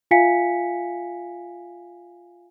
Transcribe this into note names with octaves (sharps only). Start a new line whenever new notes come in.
F4 E5 F5 G#5 B6 C#7